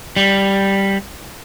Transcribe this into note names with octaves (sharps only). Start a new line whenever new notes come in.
G3